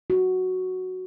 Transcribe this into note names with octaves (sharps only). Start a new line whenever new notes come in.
F#4